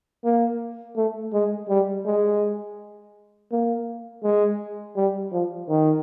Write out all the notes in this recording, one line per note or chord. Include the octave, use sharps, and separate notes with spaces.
A#3
A3
G#3
G3
G#3
A#3
G#3
G3
F3
D#3